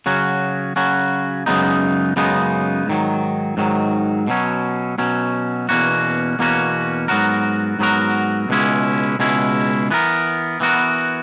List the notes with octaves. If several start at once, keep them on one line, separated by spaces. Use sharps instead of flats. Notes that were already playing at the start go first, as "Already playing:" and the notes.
C#3 F#3 C#4 F#4
C#3 F#3 C#4 F#4
F#2 C#3 G#3 B3 D#4
F#2 C#3 G#3 B3 D#4
G#2 D#3 F#3
G#2 D#3 F#3
B2 F#3 C#4
B2 F#3 C#4
E2 B2 A#3 C#4 F#4
E2 B2 A#3 C#4 F#4
G#2 F#3 B3 F#4 A#4
G#2 F#3 B3 F#4 A#4
C#2 B2 G#3 C#4 E4
C#2 B2 G#3 C#4 E4
E3 B3 F#4 A#4
E3 B3 F#4 A#4